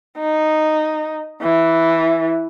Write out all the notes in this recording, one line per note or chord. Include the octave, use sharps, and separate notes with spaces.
D#4
E3